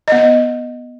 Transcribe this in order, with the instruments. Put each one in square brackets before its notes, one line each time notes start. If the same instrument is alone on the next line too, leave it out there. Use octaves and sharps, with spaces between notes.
[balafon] B3 D#5